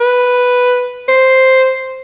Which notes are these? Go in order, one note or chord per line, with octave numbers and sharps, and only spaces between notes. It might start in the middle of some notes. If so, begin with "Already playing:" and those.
B4
C5